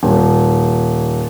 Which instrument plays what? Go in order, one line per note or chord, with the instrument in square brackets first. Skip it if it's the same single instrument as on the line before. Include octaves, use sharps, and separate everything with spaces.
[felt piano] D#1